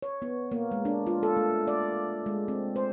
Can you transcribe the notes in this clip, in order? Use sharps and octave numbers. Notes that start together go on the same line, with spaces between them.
C#5
B3
A#3
G#3
D4
F4
A4
A3
D5
G#3
C4
C5